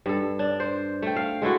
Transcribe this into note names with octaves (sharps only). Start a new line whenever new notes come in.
G2 A4
D4
C5
A3 G5
F5
G#3 A3 E4 F#4